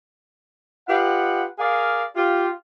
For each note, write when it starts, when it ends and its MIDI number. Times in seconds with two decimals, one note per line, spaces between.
0.88 1.45 65
0.88 1.45 67
0.88 1.45 71
0.88 1.45 75
0.88 1.45 78
1.59 2.03 68
1.59 2.03 70
1.59 2.03 74
1.59 2.03 77
2.16 2.49 65
2.16 2.49 67